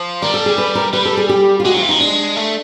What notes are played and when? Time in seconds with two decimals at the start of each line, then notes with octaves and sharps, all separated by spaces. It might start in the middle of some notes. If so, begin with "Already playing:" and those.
Already playing: F3
0.22 G3 A#4
0.34 A4
0.46 G#4
0.58 B4
0.75 A#4
0.93 G3 B4
1.05 A4
1.17 G#4
1.29 G4
1.60 F4
1.65 G#3 F#4
1.74 F#3 F4
1.82 E3
1.89 F3 D#4
2.01 G#3 D4
2.36 A3